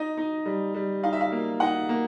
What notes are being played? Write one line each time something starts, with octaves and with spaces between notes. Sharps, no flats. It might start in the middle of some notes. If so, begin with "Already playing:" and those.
Already playing: D#4 D#5
D#4
G3
G3
D#4 F5
E5
F5
A#3
D#4 F#5
A#3